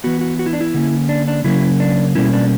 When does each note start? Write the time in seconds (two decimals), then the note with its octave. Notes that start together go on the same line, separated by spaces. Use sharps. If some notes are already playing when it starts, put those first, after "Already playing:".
0.04 E3 B3 F#4
0.21 F#4
0.39 F#4
0.46 E4
0.53 D4
0.61 E4
0.74 D3 A#3 C#4
1.09 D4
1.28 D4
1.44 C#3 F#3 A#3 C#4 E4
1.80 D4
2.15 B2 G3 A#3 C#4 E4
2.33 D4